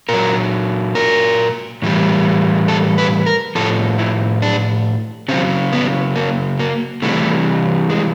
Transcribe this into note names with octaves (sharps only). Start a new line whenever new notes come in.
A#2 F#3 A#4
A#4
A2 E3 G3
A4
B4
A#4
A2 F3 A4
E4
D4
C#3 F#3 C4
B3
A#3
A#3
C3 E3 G3 A3
G#3